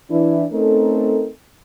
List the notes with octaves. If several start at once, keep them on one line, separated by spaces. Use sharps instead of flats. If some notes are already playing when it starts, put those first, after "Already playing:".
E3 D4 E4
A3 C4 C#4 D#4 A4 A#4